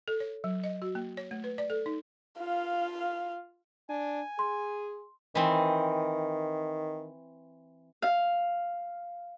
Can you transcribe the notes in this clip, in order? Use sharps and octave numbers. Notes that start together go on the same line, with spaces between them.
A4
C#5
F#3
D#5
F#4
A#3
C#5
A3
B4
D5
A4
D#4
F4 F5
D4 G#5
G#4 C6
D#3 E3 C4
F5